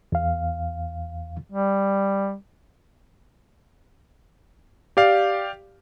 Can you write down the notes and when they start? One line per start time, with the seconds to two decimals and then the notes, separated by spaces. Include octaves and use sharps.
0.12 E2 F5
1.50 G3
4.97 G4 D5 F5